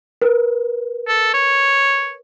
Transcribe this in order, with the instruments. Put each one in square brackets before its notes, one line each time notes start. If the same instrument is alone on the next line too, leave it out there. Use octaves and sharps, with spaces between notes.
[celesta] A#4 B4
[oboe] A4
C#5